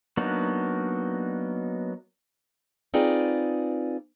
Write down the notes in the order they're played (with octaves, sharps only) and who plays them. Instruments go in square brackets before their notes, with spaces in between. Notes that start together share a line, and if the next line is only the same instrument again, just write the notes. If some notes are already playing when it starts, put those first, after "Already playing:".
[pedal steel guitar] F#3 A#3 B3 D4 D#4
[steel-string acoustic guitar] C4 D#4 F4 G#4 B4 D5